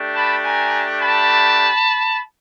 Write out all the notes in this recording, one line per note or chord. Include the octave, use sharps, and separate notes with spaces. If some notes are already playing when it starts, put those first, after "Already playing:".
Already playing: A3 D4 G4
A5 B5
G#5 A#5
A5 B5